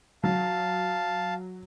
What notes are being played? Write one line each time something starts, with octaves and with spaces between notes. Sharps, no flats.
F#3 F5 A5